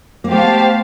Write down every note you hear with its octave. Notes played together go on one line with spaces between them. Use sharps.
A#3
A3 B3 G4 C5 F5 A5